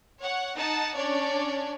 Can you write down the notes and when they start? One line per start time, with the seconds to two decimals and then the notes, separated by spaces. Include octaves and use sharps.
0.20 C#5 F#5
0.55 D#4 F#5 A5
0.96 C#4 D4 C#5 D5